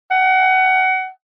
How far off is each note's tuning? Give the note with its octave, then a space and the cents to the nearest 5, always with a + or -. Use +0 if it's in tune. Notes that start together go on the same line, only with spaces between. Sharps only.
F#5 +25